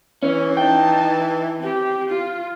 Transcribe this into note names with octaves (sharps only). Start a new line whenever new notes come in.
E3 C#4
D#4 G5 A5
C4 G4
F4